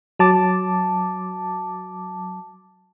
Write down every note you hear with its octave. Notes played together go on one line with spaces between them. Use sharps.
F#3 A5 D6